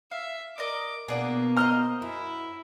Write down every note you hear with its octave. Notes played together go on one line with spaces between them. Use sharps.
E5 F5
A#4 D5 D#5 D6
B2 A#3 B3 D4 G#4 D5
C5 D5 D#5 A#5 F6
F#2 E4